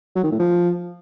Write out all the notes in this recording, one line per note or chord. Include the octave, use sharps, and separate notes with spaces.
F#3
D#3
A2
F3